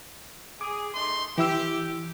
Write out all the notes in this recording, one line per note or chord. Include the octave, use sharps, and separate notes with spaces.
G#4 D6
A3 D#4 C6
E3 E4 G4 E6